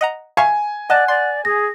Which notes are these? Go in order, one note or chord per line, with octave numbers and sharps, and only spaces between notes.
D#5 F#5 A#5
E5 F5 G#5 C#6
D5 D#5 F#5 A5 F#6
D5 C6
G#4 A#6